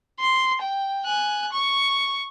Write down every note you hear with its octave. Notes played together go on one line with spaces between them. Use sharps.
C6
G5
G#5 F#6
C#6